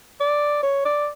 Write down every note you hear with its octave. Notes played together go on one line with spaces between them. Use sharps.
D5
C#5
D5